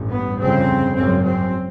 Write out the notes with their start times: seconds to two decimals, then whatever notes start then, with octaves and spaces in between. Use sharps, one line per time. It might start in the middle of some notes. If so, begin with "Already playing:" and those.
Already playing: A1 G2
0.10 B3
0.38 G1 F2 C#3 C4
0.94 G#1 F#2 C#3 C4
1.23 C4